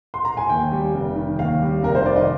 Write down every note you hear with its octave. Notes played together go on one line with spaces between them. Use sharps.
C6
A#5
G#5
D#2 G5
G3
F1
D#3
D#2 F5
G3
F1 A#4
C5
D#3 D5
D#5